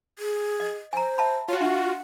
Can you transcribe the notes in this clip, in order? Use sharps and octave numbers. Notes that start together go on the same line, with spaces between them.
G#4
D#5
C5 G#5 A#5
E5 A5 B5
F4 F#4 C#5
D4 E5 F#5